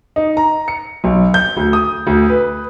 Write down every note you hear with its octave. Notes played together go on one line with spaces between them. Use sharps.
D#4
A#5
C#7
B1
G6
D2
D#6
D2
B4